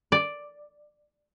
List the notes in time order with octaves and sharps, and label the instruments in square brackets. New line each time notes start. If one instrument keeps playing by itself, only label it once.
[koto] D5